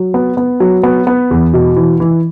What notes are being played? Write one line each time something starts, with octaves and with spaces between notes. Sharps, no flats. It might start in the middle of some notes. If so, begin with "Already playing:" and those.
Already playing: F#3
B3
B3
F#3
B3
B3
E2
B2
E3
E3